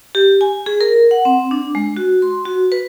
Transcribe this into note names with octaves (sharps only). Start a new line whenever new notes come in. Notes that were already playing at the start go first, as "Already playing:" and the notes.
G4
G#5
G#4
A#4
F#5
C4
D4
G#3
F#4
C6
F#4
B4